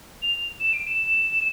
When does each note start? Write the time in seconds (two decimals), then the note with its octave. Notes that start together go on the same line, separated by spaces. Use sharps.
0.22 F7
0.60 E7
0.73 D7
0.87 E7